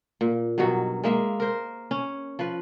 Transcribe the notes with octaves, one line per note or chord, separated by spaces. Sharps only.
A#2
G2 B2 D#3 F#3
G#3 A#3 E5
A#4 C5
C#4
F3 B4